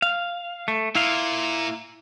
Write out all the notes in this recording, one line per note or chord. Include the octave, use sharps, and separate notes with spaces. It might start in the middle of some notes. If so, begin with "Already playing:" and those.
F5
A3
A#2 E4 F5